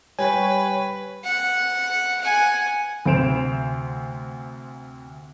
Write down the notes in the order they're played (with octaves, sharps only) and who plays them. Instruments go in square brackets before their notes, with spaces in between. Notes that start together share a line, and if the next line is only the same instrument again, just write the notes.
[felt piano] G3 [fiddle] B4 [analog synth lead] C#5 [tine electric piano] G5 G#5
[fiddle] F#5
F#5 G#5
[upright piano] D2 C3 C5 D7 E7 F7